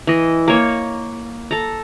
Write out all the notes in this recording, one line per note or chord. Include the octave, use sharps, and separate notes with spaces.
E3 D#5
A#3 C#5
A4 A#5